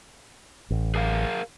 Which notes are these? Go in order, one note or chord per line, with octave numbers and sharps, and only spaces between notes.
A1
G#4 A#4 F5